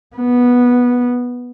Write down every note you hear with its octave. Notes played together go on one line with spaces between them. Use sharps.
B3